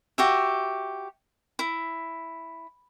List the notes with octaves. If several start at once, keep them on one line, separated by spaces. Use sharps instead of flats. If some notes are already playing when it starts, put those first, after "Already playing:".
F#4 G4 E5
E4